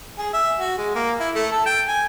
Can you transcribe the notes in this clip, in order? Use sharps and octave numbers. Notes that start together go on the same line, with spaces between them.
G#4
E5
F#4
G#3
A#3
E4
A3
A4
G5
G#5